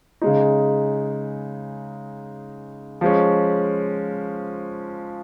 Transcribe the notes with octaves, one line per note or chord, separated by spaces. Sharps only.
C#3 G#3 D#4
F3 G#3 C#4